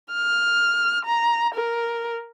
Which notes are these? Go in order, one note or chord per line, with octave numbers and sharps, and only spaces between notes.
F6
A#5
A#4